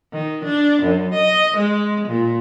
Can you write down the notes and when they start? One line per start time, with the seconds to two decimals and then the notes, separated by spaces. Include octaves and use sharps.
0.13 D#3
0.45 D4
0.83 F#2
1.14 D#5
1.57 G#3
2.08 A#2